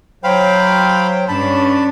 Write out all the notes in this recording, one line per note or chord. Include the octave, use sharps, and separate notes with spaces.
F#3 C5 F5 G5 B5
G2 C#4 D4 A5 B5